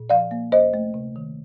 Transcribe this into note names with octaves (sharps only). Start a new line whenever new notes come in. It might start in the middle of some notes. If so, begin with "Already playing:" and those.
Already playing: A#2
F3 D5 F5
A#3
D2 C5 D#5
A3
C3
D#3